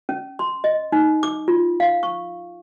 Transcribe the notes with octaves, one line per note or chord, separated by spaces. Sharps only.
C#4
C6
D#5
D#4
D6
F4
F5
C#6